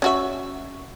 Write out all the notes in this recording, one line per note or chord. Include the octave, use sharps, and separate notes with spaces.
C#4 F#4 E5